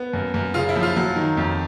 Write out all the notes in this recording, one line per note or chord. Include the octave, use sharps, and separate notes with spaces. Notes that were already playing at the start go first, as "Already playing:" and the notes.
Already playing: B3
F#2
F#2
C#3 F4
E4
F3
F4
F#3
D#3
F2